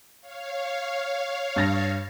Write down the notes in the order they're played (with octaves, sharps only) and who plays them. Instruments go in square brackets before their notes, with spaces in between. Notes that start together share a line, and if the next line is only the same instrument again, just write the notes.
[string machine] C#5 F5
[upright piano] G2 A6 A#6